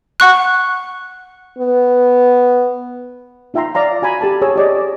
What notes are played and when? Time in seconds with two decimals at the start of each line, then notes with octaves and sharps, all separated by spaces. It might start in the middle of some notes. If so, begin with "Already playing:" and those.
0.20 F#5 C#6 F#6
1.59 B3
3.54 D#4 F4 E5 G5 A#5 C6
3.74 D5 F5 A#5 C6
4.02 F#4 G#5 A#5 B5
4.21 G4 A4 A5
4.42 G#4 C#5 D#6 E6
4.56 G4 D5 D#5